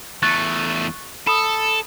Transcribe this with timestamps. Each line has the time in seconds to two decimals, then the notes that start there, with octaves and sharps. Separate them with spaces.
0.23 E2 A3 C#6 F#6 A6
1.27 A4 B5 D#6